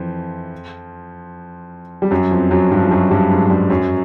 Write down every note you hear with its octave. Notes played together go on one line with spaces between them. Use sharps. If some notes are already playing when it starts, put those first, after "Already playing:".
Already playing: F2 E3 F3
G3
F#2 F#3
F2 F3
F#2 F#3
G2 G3
F3
F#2 F#3
G2 G3
G#2 G#3
G2 G3
F#2 F#3